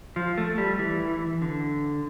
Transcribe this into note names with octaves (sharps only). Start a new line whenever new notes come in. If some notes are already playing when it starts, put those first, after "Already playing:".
F3
A3
G3
E3
D3